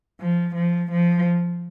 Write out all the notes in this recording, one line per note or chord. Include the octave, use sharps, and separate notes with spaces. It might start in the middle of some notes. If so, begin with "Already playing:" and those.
F3
F3
F3